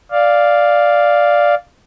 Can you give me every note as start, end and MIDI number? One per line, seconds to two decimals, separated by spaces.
0.12 1.55 74
0.12 1.55 77